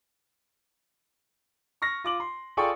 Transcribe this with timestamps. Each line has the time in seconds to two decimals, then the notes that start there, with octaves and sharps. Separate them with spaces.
1.82 C#6 F6 A#6
2.04 F4 D6 F#7
2.20 C6
2.57 F4 G#4 A4 D5 G5 C#6